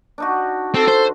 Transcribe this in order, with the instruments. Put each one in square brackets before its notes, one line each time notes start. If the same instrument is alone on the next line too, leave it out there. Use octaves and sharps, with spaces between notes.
[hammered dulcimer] D4 D#4 F#4
[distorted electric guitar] C4 [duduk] A4
[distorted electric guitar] C5